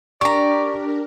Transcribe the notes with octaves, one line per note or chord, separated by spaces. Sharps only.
D4 G4 A#4 D5 A#5 C#6